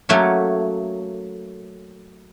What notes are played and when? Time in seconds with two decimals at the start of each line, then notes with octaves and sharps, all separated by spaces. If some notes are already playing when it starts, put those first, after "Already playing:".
0.09 F#3 A3 A#3 C#4